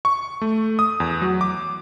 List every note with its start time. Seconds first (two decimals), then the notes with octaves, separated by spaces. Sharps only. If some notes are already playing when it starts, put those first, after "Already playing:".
0.05 C#6
0.42 A3
0.79 D#6
1.00 E2
1.22 F#3
1.41 D6